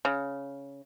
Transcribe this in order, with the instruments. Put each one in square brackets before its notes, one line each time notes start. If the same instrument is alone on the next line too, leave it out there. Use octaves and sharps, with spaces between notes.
[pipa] C#3